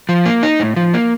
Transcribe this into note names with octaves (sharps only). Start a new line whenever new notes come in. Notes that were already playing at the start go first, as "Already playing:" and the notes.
F3
A#3
D#4
A2
F3
A#3